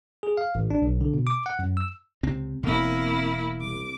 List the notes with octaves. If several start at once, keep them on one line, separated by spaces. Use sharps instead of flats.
G#4
F5
A1
D4
B1
D3
B2
D6
F#5
F#2
E6
C#2 C3 C4
E1 B2 A#3 C4 E4
C2 D6